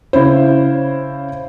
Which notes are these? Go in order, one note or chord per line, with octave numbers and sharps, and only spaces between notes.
C#3 E4 C5